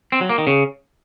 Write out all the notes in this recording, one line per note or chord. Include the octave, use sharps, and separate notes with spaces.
C4
F#3
A#3
D#3
C#3